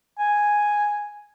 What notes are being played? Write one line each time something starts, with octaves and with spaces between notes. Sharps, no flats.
G#5